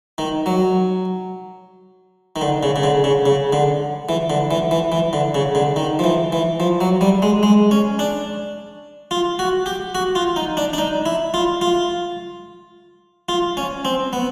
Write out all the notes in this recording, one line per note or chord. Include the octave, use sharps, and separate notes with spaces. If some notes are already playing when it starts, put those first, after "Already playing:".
D#3
F#3
D#3
D3
C#3
C#3
D3
C#3
C#3
D3
E3
D3
E3
E3
E3
D3
C#3
D3
D#3
F3
E3
E3
F3
F#3
G3
G#3
G#3
C#4
D4
F4
F#4
G4
F#4
F4
D#4
D4
D4
D#4
E4
F4
F4
F4
C#4
C4
B3